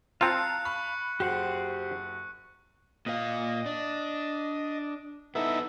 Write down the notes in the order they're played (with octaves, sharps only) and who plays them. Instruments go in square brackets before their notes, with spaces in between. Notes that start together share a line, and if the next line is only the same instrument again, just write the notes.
[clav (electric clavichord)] C4 F4 [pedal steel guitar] F5 [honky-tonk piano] A5 A#5 [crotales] F#6 C#7
[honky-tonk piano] B5 [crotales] C#6
[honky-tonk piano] F#1 F#4 [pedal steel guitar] G4 C5 F#5
[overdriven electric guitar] A#2 F5 [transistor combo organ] D#5
[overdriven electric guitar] D4
[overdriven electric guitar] B3 A4 [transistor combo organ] D#4 E4 E5